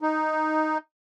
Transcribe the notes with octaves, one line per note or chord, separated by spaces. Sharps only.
D#4